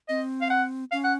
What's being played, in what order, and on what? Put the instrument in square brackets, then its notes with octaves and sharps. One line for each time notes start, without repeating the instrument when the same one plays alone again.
[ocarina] C4 [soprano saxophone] D#5
[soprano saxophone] F5
F#5
[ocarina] C#4 [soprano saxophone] F5
[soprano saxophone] F#5